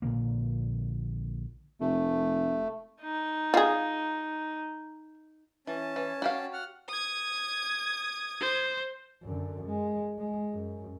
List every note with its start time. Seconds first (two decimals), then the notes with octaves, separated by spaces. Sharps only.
0.02 A#1 A#2 D3 A#3
1.81 F1 A3
3.02 D#4
3.54 F4 G#4
5.67 E3 C#4 A5
5.96 E3
6.22 F#4 G4 F5
6.53 F#5 F6
6.88 D#6 G#6
8.40 C5
9.23 F#2 D3
9.65 G#3
10.18 G#3
10.53 F#2